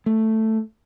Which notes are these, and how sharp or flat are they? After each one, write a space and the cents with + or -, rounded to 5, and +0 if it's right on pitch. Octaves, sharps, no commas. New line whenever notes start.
A3 +5